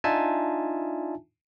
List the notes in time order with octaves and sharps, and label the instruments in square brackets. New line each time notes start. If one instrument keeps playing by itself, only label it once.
[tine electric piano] D4 D#4 F4 E5 G#5 A5